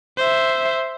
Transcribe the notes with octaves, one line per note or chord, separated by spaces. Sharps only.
C5 E5